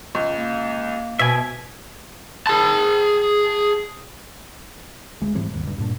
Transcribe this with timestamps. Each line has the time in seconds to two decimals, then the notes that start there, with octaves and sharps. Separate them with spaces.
0.15 C#2
0.37 A#3
1.19 B2 E5 G#5
2.47 G#4 A5
5.21 D2 G#3
5.35 G#2 E3 G3 C4
5.50 G#1 D#2
5.63 C#2 G2
5.78 G2 A#2 D4